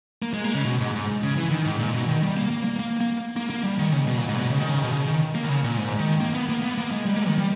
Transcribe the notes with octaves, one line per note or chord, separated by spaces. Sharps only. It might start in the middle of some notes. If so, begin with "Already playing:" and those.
A#3
G#3
A#3
C#3
B2
G#2
G#2
C#3
E3
D#3
G#2
A#2
B2
D#3
G3
A#3
A#3
A#3
A#3
A#3
A#3
A#3
G3
D#3
C#3
B2
A#2
G#2
B2
C#3
D#3
C#3
B2
C#3
D#3
A#3
D#3
C#3
A#2
G#2
D#3
A#3
B3
A#3
B3
A#3
G#3
G3
A#3
D#3
G3